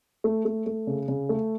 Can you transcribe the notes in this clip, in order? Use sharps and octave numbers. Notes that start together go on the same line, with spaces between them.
A3
A3
A3
C#3
C#3
A3